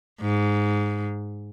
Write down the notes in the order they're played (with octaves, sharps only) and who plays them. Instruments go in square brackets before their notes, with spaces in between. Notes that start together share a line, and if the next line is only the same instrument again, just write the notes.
[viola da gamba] G#2